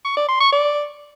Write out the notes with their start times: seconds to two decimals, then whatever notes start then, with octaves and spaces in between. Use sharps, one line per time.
0.05 C#6
0.16 D5
0.28 C6
0.40 C#6
0.52 D5